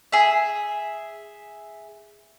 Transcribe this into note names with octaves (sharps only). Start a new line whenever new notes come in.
G#4 E5